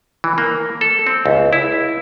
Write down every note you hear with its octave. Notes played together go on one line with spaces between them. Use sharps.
E3
A#3
A4
C4
C#2
E4